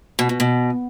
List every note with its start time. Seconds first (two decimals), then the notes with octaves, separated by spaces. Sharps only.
0.19 B2
0.29 B2
0.40 B2